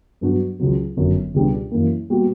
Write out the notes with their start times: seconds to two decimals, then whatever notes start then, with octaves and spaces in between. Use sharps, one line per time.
0.21 G2 F#3 B3 D4 F#4
0.60 C#2 C#3 F#3
0.97 G1 F#2 D3 F#3
1.34 C#2 B2 G3 B3 D4
1.71 F#2 E3 A#3
2.10 A#2 G3 B3 F#4